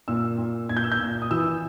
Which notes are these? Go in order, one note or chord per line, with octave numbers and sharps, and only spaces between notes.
A#2 E6
A#2
A#2 G#6
G6
E6
G6
A#2
D#6
E3 E6